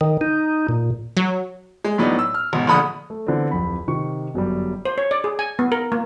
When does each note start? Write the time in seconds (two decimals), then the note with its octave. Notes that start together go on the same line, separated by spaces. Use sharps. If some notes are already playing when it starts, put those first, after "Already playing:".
0.01 D#3
0.21 D#4
0.68 A#2
1.17 F#3
1.84 G#3
1.98 A2 F#3 B3 D4 D#4
2.19 E6
2.34 F6
2.53 G#1 B2
2.67 A#1 D3 B5 D#6
3.10 A3
3.27 D3 E3 B3 C4
3.51 D1 F2 B5
3.88 C3 D#3 C#6
4.34 G1 F#2 F#3 G3
4.85 C5
4.98 C#5
5.11 D5
5.24 G#4
5.39 G#5
5.59 B3
5.72 A#4
5.92 A#3